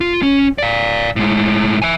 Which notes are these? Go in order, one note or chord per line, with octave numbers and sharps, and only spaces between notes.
F4
C#4
D5 F5
A2 G#3
E5 G#5